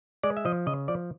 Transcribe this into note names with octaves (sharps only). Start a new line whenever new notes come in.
G#3 D5
E5
F3 D#5
C#3 D#5
F3 D5